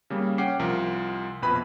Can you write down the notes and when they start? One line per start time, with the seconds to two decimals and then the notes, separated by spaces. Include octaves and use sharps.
0.10 C#3 G3 A#3
0.38 C#4 F#5 G5 D6 C7
0.59 C2 F3 A#4
1.42 A#1 F2 B2 B4 B5